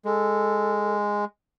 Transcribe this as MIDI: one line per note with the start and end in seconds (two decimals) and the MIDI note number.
0.05 1.25 56
0.05 0.96 69